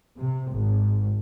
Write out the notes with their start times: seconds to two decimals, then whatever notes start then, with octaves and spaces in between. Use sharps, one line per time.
0.18 C3
0.53 G#1